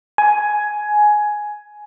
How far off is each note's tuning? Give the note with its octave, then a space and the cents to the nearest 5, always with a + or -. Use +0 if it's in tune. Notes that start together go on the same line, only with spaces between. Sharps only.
G#5 +10